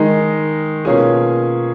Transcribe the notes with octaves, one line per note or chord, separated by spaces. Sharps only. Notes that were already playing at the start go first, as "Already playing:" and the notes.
Already playing: D#3 G#3 D#4 A#4
B2 A#3 C#4 F4 G#4